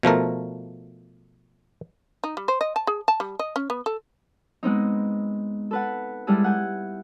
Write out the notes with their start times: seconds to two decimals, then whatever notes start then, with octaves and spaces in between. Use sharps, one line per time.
0.03 B2 F3 A3 A#4
2.24 D#4
2.37 G3
2.48 C5
2.61 D#5
2.76 A5
2.87 G#4
3.08 A5
3.20 G3
3.39 D#5
3.56 C#4
3.70 B3
3.86 A4
4.63 G#3 B3 C4 D#4
5.71 A4 B4 F#5
6.27 G3 G#3 E4 G#4 A4
6.44 F#5 G#5 G6